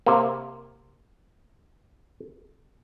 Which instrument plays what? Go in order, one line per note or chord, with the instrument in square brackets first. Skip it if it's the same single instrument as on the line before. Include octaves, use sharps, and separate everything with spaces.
[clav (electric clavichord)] C3 A#3